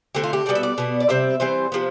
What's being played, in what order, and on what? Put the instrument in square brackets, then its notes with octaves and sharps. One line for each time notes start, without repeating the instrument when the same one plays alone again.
[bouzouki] D3 A3 C4 G4
F4
G4
B2 G3 B3 D5
E5
D5
B2 B3
D5
C3 G3 C4 E5
E3 G3 C4 C5
C3 F3 B3